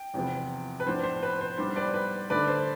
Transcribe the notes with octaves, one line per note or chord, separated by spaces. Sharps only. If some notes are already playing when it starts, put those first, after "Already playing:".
Already playing: G5
E2 C3 F3 B3
B4
A2 F3 B3 D4 C5
C5
B4
C5
A2 G3 B3 D4 C5
B4 D5
B4
D3 A3 D4 B4 D5
C5